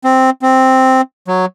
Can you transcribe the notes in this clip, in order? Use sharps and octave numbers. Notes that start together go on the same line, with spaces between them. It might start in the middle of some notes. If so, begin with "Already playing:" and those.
C4
C4
F#3